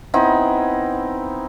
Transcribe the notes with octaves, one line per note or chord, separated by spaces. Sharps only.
B3 C4 D#4 E4